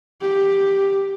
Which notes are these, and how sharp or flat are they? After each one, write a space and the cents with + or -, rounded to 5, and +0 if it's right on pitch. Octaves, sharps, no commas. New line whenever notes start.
G4 +5